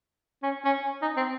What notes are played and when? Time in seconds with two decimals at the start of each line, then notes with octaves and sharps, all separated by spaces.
0.43 C#4
0.65 C#4
1.02 D#4
1.17 C4